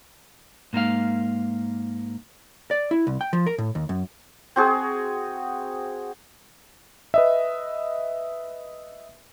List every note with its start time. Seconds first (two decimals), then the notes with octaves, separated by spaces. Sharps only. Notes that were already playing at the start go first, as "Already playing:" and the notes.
0.73 G#2 A#3 D#4 F5
2.71 D5
2.91 E4
3.07 C2
3.21 G5
3.33 F3
3.47 A#4
3.58 A2
3.75 D#2
3.89 F#2
4.56 C4 F#4 G#4
7.14 B4 D#5 E5